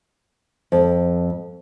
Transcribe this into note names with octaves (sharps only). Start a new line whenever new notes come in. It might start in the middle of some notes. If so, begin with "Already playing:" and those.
F2